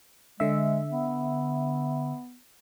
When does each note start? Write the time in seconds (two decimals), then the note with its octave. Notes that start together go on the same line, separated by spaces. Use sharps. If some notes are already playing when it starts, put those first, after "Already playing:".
0.40 D3 G#3 E5
0.90 B3